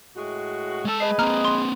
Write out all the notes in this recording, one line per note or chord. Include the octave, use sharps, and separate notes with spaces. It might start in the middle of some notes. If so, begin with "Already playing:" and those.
A2 G#3 F#4
G#3 A4 A5
G#4 B4 D#5 C7
A#3 C4 A#5 F6
C6